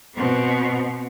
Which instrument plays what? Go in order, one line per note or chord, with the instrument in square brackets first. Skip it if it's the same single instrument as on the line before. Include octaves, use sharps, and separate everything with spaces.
[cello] B2 C4